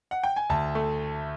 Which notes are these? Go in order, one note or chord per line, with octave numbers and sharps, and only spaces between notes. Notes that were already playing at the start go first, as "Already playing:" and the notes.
F#5
G5
G#5
D2 A5
A3